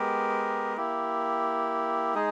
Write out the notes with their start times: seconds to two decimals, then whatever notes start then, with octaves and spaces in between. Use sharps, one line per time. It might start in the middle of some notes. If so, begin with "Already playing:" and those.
Already playing: G#3 B3 G4 A#4
0.77 A#3 E4 G4
2.15 G#3 D#4 G#4